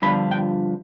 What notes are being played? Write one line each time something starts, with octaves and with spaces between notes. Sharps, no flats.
G2 D3 F3 B3 F4 B5
G5